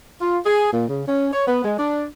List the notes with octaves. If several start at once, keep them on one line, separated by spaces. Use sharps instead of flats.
F4
G#4
A#2
C#3
C#4
C#5
B3
G#3
D4